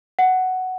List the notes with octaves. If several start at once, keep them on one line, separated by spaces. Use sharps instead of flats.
F#5